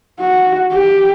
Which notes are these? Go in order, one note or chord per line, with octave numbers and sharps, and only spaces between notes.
F#4
G4